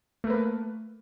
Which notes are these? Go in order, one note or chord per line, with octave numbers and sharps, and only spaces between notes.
A3 A#3 A#4 B4